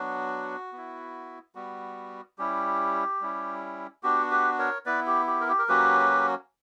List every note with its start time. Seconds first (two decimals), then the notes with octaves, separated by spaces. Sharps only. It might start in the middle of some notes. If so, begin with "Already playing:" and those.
Already playing: F#3 B3 D4 F#4
0.73 B3 E4
1.55 G3 B3 F#4
2.38 G3 C#4 E4 G4
3.21 G3 C#4 E4
4.03 B3 D4 F#4 G4
4.31 G4 B4
4.59 A#4 C#5
4.86 B3 E4 B4 D5
5.07 G4
5.27 G4
5.41 A#4
5.48 G4
5.59 A#4
5.69 F#3 A#3 C#4 F#4 G4 B4